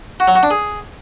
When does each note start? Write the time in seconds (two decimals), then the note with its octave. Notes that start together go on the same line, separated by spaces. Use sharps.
0.20 F#4
0.28 F#3
0.35 F#4
0.43 D4
0.51 G#4